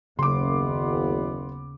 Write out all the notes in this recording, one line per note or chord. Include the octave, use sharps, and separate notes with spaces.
F#1 D#2 C#3 B3 C6 D6